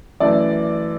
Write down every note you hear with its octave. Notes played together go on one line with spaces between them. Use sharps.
F#2 E3 A3 D5